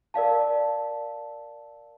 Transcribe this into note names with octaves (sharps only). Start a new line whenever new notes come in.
A#4 D5 F5 A5